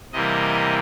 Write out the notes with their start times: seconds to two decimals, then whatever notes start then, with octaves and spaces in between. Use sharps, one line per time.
0.13 C3 E3 G3 A#3 D#5